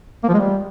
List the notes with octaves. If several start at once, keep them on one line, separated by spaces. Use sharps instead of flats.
A#3
F3
G#3
G3